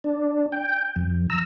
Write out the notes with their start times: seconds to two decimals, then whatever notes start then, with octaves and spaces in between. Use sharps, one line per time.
0.04 D4
0.52 G5
0.96 F2
1.30 A#5 E6